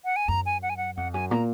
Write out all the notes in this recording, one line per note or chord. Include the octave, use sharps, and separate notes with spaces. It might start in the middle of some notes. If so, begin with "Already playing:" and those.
F#5
G#5
F#2 A#5
G#5
F#5
G#5
F#5
F2 F#5
F#2 G#5
A#2 A#5